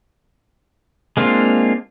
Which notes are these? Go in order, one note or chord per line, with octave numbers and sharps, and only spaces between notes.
G#3 A#3 C4 D4 F4